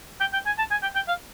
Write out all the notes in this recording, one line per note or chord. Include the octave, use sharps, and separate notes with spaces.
G5
G5
G#5
A5
G#5
G5
G5
F5